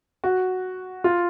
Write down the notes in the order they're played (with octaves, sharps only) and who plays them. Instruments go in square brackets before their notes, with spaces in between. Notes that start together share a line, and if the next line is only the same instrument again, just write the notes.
[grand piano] F#4
F4